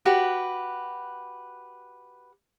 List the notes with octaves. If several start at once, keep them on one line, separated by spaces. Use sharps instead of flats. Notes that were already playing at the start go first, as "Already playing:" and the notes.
F#4 G4 B4